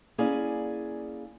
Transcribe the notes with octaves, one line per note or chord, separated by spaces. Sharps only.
A#3 C#4 E4 G#4 D5 G#5